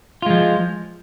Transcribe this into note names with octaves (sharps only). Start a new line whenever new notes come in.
F3 G#3 F4